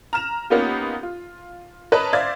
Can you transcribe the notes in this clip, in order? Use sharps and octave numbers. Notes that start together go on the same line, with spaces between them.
A#5 F6 E7
A#3 B3 C#4 D#4 F4 G4
F4
A#4 B4 C#5 D#5 A5 B5
C5 D5 E5 F5 G#6 A6